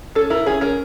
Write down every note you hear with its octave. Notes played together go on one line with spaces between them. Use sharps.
C#4 A4
E4 A#4
C#4 G#4
C#4 A#4